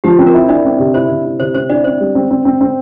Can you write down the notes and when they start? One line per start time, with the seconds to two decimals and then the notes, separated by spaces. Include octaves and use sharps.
0.04 F3 G4
0.19 C4
0.27 A#4
0.34 E4
0.49 D4 E4 D5
0.65 C4
0.79 C3
0.94 E4 C5
1.10 C3
1.25 E4
1.40 C3 C5
1.55 C4 C5
1.70 D4 E4 D5
1.84 C4 C5
2.00 G3
2.15 C4
2.31 C4
2.45 C4
2.61 C4